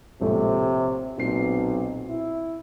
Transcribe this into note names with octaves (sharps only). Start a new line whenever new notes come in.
A#1 A2 C3 A3
B1 A#2 C4 C7
E4